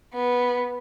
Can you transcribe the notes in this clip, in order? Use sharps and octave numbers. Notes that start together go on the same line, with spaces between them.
B3